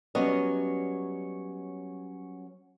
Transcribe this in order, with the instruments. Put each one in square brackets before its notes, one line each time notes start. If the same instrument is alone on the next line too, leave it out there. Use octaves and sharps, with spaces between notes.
[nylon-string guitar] F#3 G3 B3 C#4 D#5